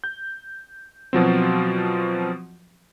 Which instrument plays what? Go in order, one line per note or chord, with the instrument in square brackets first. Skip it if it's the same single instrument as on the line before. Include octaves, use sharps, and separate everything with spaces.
[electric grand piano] G6
B2 F3 F#3 C4